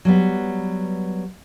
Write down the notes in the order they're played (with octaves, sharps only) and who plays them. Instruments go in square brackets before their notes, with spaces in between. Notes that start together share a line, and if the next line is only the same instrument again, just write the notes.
[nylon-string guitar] F#3 G3 B3